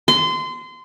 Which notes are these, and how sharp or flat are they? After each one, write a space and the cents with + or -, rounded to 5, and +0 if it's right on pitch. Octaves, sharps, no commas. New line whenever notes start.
C6 -25